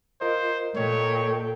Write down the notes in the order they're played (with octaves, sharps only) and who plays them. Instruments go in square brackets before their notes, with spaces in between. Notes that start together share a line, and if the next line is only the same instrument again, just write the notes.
[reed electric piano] F4 A#4 D#5 [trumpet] C5
[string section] A#2 [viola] A4 G5 [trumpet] C#5